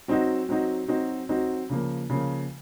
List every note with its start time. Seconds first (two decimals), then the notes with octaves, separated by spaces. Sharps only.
0.08 F#3 C4 D#4 F#4
0.49 F#3 C4 D#4 F#4
0.88 F#3 C4 D#4 F#4
1.29 F#3 C4 D#4 F#4
1.70 C#3 F3 A#3
2.10 C#3 F3 A#3